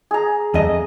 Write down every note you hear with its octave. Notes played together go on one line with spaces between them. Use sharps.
G#4 A#5
F2 D#5